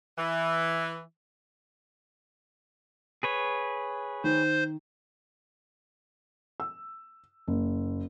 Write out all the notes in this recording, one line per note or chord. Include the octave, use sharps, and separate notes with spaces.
E3
G#4 B4 C#5
D#3 C5
E6
F#1